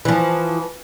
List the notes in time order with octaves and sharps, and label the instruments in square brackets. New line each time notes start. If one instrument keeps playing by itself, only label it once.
[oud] E3 F3